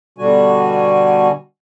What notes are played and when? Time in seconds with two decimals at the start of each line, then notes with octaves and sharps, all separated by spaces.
0.18 B2 D3 G3 D4 F#4 G#5